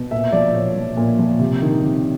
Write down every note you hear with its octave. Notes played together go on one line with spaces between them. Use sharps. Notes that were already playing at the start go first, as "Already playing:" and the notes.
Already playing: B2
A#2 E5
F3 D5
A#2 C#5
F3
A#2
F3
C3
D#3
C3